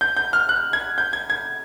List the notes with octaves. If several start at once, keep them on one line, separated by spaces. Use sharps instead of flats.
G6
G6
F6
F#6
G#6
G6
G#6
G#6